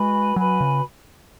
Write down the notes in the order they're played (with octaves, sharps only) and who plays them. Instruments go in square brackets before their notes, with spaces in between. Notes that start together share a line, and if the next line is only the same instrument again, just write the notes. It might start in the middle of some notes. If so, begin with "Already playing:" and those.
Already playing: [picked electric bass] G#3 [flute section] F#4 B4 G#5 B5
[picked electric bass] F#3 [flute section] F#4 B4 G#5 B5
[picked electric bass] C#3